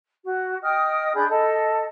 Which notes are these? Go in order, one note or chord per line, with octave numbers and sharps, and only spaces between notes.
F#4
D#5 G5 D#6 F6
D4 G#4 B5 G6
A4 D#5